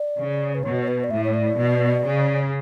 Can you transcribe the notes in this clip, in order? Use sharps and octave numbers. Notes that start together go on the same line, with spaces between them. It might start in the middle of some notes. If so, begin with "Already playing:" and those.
Already playing: D5
C#3
B4
B2 C#5
C#5
B4
D5
A2 E5
C#5
D5
B2
C#3